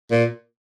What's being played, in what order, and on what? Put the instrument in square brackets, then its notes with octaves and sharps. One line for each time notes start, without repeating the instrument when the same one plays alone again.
[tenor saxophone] A#2